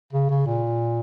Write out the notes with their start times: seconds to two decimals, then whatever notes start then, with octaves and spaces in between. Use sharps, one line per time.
0.13 C#3
0.30 C#3
0.46 A#2